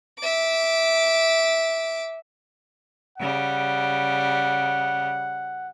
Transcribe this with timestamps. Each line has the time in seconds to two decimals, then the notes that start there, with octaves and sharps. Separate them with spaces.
0.19 E5 D6
3.18 C#3 G3 F#5